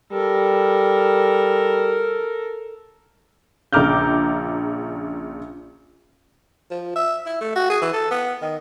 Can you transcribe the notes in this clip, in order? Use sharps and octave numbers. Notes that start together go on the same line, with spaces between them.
G3 A4 A#4
A#1 C#3 A#5 D6 F6 G6
F3
E5
E4
A3
F#4
G#4
E3
A4
B3
D#3